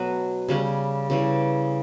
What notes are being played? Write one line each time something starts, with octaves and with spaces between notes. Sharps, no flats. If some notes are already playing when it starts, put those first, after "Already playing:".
Already playing: B2 F#3 A3 B3 F#4
C#3 G3 C#4
C#3 E3 G3